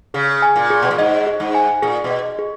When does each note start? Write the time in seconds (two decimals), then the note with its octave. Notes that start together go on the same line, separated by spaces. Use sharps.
0.14 C#3 G#4
0.42 G#5
0.56 A#2
0.70 G#4
0.82 B2
0.91 A#2
0.98 G#2 D#5
1.27 G#4
1.40 G#2
1.55 G#5
1.82 A#2 G#4
2.04 B2
2.11 D#5
2.39 G#4